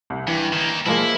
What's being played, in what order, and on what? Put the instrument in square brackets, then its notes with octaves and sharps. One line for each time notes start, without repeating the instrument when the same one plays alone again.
[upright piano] C2
[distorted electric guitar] G2 [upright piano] E3
[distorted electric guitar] D#3 A#3
[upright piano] F3 G#3 A#3 [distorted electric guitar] E4